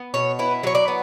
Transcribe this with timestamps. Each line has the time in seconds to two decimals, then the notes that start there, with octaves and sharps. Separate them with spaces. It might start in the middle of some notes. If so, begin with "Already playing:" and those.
Already playing: B3
0.14 B2 C#5
0.39 E4 B4
0.63 F#3 C#5
0.75 D5
0.88 B3